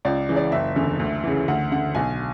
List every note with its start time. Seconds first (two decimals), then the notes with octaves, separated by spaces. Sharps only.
0.05 C#2 D5
0.29 C#3 E3
0.36 D5
0.52 F#1 E5
0.76 E2 D3
0.99 D2
1.24 C#3 E3
1.48 D2 F#5
1.72 D3 F#5
1.95 B1 G#5